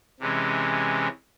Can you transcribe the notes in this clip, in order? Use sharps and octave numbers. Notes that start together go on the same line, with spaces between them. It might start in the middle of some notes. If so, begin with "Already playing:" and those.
C3 E3 G#3 C#4